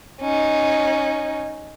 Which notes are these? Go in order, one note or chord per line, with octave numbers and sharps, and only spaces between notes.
C#4 D#4